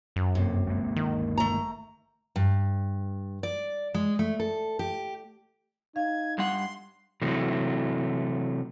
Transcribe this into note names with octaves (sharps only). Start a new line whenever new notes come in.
F#2
G2 C3 A#3
G1 G#3 A#3
D#3
A3 A#5
G2
D5
G#3
A3
A4
G4
D#4 F5 G#6
G2 G3 F#5 C6
C3 E3 F#3 A3